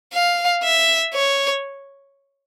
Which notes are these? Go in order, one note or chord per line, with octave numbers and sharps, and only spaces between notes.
F5
E5
C#5